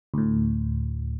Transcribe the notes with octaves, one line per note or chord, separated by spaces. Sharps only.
D2 A2